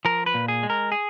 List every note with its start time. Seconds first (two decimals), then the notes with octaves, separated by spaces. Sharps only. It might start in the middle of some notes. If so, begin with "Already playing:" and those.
0.05 F3 A#4
0.26 B4
0.34 A#2
0.48 G#4
0.63 G#3
0.70 A#4
0.92 G#4